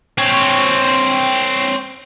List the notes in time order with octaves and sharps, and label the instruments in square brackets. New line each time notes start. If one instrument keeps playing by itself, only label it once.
[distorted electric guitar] C4 C#5